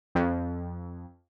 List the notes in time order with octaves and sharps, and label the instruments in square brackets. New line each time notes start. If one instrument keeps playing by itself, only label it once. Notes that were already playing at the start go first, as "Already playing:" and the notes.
[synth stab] F2